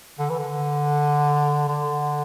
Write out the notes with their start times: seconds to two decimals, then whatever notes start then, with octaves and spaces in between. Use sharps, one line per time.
0.19 D3
0.30 E3
0.39 D3
1.68 D3